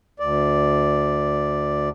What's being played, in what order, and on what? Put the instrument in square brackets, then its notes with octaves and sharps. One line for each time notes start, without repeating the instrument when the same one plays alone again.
[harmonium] D2 D5